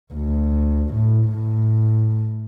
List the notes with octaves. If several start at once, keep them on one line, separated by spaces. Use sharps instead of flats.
D2
A2
A2